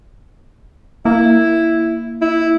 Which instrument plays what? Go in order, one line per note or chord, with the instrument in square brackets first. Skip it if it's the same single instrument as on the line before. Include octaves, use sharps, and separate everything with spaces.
[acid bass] A#3 [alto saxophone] E4
[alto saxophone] E4